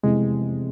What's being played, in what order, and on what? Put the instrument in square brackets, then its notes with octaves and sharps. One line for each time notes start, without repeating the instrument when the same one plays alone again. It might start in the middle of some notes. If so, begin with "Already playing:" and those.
[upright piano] F1 E2 C3 [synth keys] G#3